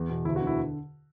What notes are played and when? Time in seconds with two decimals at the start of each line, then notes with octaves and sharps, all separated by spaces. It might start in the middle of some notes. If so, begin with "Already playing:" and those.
Already playing: E2
0.10 B2
0.25 D2 E4
0.36 F#4
0.42 D3
0.47 E4